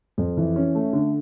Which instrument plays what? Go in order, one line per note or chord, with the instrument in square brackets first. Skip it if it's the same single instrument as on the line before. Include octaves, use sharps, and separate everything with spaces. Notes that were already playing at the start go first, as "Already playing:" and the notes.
[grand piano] F2
E3
C#4
A3
D3